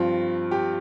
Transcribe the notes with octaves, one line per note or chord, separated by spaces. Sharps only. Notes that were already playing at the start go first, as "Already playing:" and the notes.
Already playing: G2 F3 C4 F4
G4